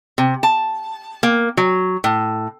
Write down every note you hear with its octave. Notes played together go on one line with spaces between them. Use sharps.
C3
A5
A#3
F#3
A2